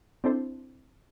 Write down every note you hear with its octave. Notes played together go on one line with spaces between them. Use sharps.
C4 D4 E4 A4 C5